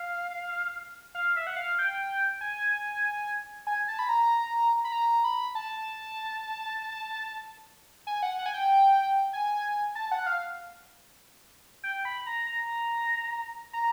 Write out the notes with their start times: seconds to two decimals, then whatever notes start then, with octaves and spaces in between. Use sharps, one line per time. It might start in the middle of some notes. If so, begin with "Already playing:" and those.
Already playing: F5
1.15 F5
1.36 E5
1.47 F#5
1.57 F5
1.79 G5
2.41 G#5
3.67 G#5
3.88 A5
3.99 B5
4.09 A#5
4.84 B5
4.92 A#5
5.24 B5
5.55 A5
8.07 G#5
8.23 F#5
8.39 F#5
8.46 G#5
8.54 G5
9.33 G#5
9.95 A5
10.11 F#5
10.26 F5
11.83 G5
12.05 B5
12.27 A#5
12.46 A#5
13.73 A#5